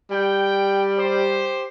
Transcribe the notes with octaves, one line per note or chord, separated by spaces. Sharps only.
G3 G5
G4 C5